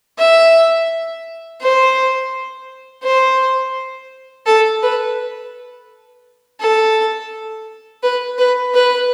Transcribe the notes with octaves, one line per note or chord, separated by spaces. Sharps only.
E5
C5
C5
A4
B4
A4
B4
B4
B4